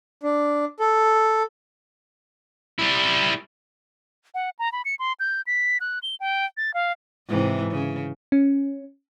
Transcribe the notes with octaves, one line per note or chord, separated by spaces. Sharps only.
D4
A4
G3 E4
F#5
A#5
B5
C#7
C6
G6
B6
F#6
G7
G5
A6
F5
G#2 C3 E3
C#3
C#4